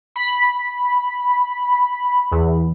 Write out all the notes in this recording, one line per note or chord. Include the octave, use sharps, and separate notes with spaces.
B5
E2